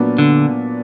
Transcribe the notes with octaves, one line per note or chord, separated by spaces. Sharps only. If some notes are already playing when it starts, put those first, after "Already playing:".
Already playing: A#2 F#3 B3 D4
D3